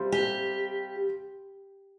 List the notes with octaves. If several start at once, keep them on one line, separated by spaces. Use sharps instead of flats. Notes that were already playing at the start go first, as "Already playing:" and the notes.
Already playing: C3 G3 C4 F4
G4